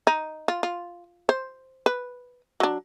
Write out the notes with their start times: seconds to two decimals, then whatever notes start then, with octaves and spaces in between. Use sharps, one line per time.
0.07 D#4
0.48 F4
0.63 F4
1.29 C5
1.86 B4
2.60 F#3 D4